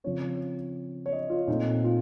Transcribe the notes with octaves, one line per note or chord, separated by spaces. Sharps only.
C#3 F3 C4 C#5
C#5
D#5
F4
A#2 A3 C4 D#4
F4